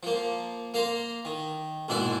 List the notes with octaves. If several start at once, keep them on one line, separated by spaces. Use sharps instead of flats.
F3 A#3
A#3 F5 A#5 C6
D#3
A#1 G#2 B2 D4 E4 D5